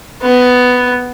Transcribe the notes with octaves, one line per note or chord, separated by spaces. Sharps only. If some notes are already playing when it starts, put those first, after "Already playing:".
B3